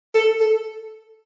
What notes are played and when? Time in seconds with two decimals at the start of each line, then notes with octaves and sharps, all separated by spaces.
0.14 A4
0.40 A4